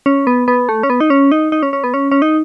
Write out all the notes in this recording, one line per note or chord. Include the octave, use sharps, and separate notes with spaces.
C#4
B3
B3
A3
C#4
B3
D#4
C#4
D#4
D#4
C#4
C#4
B3
C#4
C#4
D#4